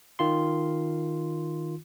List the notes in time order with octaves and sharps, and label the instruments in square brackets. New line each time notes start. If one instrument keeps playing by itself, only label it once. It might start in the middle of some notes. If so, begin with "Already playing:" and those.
[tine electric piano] D#3 F4 C6